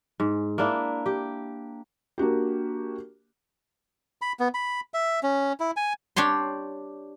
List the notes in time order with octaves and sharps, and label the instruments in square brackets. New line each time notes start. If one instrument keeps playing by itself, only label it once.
[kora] G#2
A#3 D4 E4
G4
[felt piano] A#3 D4 F#4 G4
[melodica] B5
B3
B5
E5
C#4
E4
G#5
[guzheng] D4 G4 C#5 C6